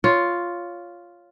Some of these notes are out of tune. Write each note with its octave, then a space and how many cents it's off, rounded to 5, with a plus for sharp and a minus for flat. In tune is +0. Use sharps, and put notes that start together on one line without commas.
F4 +0 C#5 +10